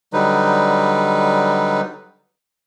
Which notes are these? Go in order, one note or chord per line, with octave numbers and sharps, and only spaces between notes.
D3 F#3 G3 D#4 B4